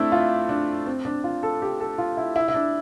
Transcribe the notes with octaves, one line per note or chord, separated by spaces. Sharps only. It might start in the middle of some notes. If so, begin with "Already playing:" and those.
Already playing: A3 C4 D4 E4
F4
D4
C4
D4
F4
A4
G4
A4
F4
E4
E4
E4
D4